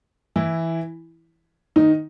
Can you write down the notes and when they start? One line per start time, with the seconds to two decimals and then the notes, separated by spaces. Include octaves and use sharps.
0.36 E3 E4
1.76 D#3 D#4